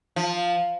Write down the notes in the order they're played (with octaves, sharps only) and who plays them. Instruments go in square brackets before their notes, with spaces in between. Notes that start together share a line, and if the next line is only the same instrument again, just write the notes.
[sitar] F3